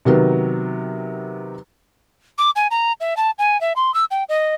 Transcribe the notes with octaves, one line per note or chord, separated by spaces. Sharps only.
C3 D#3 F#3 B3
D6
G#5
A#5
E5
A5
G#5
E5
C6
E6
G5
D#5